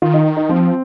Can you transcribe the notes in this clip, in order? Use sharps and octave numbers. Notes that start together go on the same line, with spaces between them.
D#3 F4
D#4
D#4
F3 C4